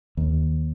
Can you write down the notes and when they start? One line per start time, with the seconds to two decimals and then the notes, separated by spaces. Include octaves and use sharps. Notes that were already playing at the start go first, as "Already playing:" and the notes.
0.17 D#2